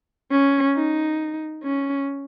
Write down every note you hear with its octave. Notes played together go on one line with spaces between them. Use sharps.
C#4
D#4
C#4